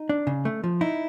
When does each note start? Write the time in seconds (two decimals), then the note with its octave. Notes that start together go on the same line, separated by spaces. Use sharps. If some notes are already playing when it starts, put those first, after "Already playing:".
Already playing: D#4
0.09 D4
0.27 C#3
0.45 A3
0.64 F3
0.81 D#4 E4